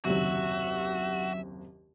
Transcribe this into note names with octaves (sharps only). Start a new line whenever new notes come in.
F#1 D#2 C3 F#3 F#4 E5